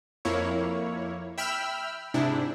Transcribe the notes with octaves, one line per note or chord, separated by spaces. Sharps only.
F2 A#3 E4 C#5
E5 G5 B5 E6 F6
G#2 C3 D4 E4